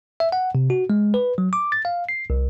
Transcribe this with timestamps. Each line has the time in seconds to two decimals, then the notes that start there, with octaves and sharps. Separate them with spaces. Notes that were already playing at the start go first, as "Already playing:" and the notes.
0.20 E5
0.32 F#5
0.55 C3
0.70 F#4
0.90 G#3
1.14 B4
1.38 F#3
1.53 D6
1.72 A6
1.85 F5
2.09 C7
2.30 C2